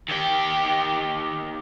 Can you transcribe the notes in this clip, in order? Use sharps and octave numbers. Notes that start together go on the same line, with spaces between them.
D#2 G4